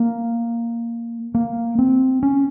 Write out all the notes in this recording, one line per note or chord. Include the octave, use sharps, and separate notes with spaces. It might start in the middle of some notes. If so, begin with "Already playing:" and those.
Already playing: A#3
A#3
C4
C#4